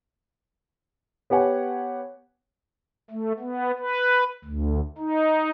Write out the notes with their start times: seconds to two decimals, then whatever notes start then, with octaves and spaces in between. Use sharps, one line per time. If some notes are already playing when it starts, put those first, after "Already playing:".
1.30 B3 G4 C#5 F#5 G#5
3.10 A3
3.39 B3
3.79 B4
4.45 D2
4.98 D#4